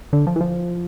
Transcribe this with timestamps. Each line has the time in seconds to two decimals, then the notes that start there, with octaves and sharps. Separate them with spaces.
0.13 D3
0.27 F3
0.36 E3
0.41 F3